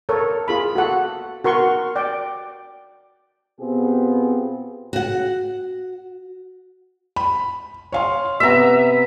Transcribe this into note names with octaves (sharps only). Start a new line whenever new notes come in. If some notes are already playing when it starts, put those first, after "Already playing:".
A4 A#4 C#5
F4 G#4 B5
F#4 A4 F#5
F#4 A#4 C6 C#6
D5 G5
B2 B3 C4 F4 G4 G#4
F#4 F#5
B5
C#5 F5 C6
C3 B3 B4 E5 A#5